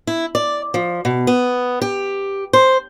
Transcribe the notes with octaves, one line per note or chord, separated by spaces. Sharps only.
E4
D5
F3
B2
B3
G4
C5